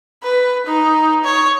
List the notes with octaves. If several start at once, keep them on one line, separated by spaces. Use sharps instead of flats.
B4
D#4
C#5